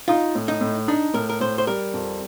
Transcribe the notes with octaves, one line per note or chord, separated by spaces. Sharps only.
D#4 F4
A2
D#4
A2
D4 D#4
A2 A#4
A#4
A2 C5
C5
G3 A#4
F2